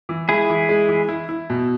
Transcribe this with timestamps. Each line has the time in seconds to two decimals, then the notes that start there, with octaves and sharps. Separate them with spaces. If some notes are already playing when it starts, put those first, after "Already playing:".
0.09 E3
0.28 G#3 E4 G#4
0.50 E3
0.69 G#3
0.89 E3
1.09 E4
1.29 E4
1.50 B2